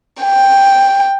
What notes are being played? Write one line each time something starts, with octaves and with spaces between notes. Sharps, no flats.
G5